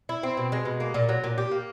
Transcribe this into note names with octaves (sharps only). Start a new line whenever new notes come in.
E4
C4
B2
G#3
B2
A#3
A#2
F#3
A#2
G4
A#3